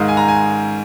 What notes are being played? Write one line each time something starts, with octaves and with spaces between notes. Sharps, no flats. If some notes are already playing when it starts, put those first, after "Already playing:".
Already playing: G#2 D#3 G#3 F5
G#5
A#5
G#5